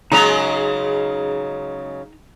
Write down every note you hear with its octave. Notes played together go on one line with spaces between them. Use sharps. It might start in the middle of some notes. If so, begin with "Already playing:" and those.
C#3 F#3 G#3 D#4 G#4 A#5